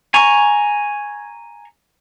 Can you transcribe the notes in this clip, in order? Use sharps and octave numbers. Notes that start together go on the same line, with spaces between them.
G#5 A#5 C#6